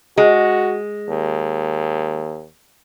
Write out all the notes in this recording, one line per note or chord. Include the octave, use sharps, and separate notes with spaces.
G#3 F#4
D#2